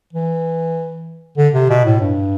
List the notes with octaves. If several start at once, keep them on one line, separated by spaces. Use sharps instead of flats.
E3
D3
C3
B2
A2
G2